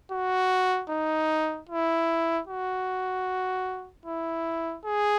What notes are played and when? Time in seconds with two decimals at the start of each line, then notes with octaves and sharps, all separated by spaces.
0.12 F#4
0.90 D#4
1.69 E4
2.47 F#4
4.06 E4
4.85 G#4